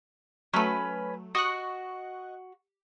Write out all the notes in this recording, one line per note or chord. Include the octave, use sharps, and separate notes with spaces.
F#3 A3 C#4 B4
F#4 D#5 C#6 F#6